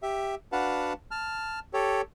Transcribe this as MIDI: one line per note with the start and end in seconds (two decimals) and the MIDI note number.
0.02 0.35 67
0.02 0.35 76
0.52 0.93 62
0.52 0.93 66
0.52 0.93 71
0.52 0.93 77
0.52 0.93 78
0.52 0.93 81
1.11 1.59 81
1.11 1.59 89
1.73 2.01 67
1.73 2.01 69
1.73 2.01 73